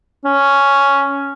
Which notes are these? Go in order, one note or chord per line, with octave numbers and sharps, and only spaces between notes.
C#4